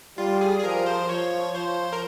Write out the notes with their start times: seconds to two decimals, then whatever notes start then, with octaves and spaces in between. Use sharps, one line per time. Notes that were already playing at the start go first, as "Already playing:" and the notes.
0.18 G3 F4
0.41 G#4
0.60 G#4
0.64 F3 A#4
0.86 C5
1.09 F3 C#5
1.55 F3 C5
1.92 A#4